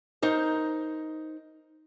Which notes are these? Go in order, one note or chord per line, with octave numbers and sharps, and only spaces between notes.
D#4 A#4 C5